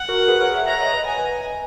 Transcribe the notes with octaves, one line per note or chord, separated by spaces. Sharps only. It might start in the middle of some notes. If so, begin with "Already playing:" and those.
Already playing: F#5
F#4 A#4
G#4 B4
A#4 C#5
C#5 E5
C#5 E5 A#5
D#5 F#5
B4 D#5
G#5